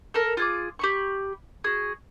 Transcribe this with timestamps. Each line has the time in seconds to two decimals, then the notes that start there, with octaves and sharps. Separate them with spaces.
0.14 A4 A#4
0.37 F4 G#4 D6
0.79 G4 B5 C#6
1.64 F#4 G#4